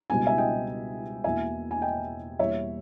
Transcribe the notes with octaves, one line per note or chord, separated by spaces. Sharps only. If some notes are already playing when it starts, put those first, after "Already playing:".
C#2 B2 G3 B3 G#5
E5 G#5
D#5 G5
E1 E2 B2 A#3 E5 G#5
G#5
D#5 G5
E2 B2 G3 A#3 C#5 E5